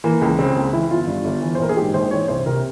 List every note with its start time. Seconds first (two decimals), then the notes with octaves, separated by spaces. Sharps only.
0.04 E3 A#3
0.21 C#2
0.39 C#3 C4
0.56 C#2
0.73 E3 E4
0.91 G1 F4
1.07 G2
1.24 G1
1.42 E3
1.55 C5
1.59 A#1 A#4
1.69 G#4
1.77 G#2 G4
1.94 A#1 C5
2.11 E3 C#5
2.28 C2 C5
2.46 C3 A#4